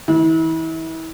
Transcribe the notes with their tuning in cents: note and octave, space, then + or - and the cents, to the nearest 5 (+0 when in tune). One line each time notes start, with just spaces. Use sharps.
E3 -35